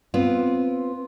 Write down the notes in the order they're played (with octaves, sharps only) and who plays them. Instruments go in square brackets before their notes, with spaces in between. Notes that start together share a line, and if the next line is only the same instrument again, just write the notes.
[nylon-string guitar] B3 C4 F4